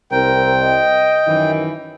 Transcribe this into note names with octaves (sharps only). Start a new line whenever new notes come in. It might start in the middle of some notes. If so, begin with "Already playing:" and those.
C2 C4 A#4 G5
D#5
F#2 D#3 E3